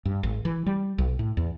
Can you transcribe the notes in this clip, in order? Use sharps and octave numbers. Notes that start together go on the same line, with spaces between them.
G2
G#1
E3
G3
B1
A2
E2